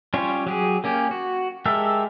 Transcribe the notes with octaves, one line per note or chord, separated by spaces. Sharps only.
G3 C#4 F4 G4 C#5
F#3 G4 G#4
A#3 C#4 G4
F#4
G#3 G4 A4 A#4 E5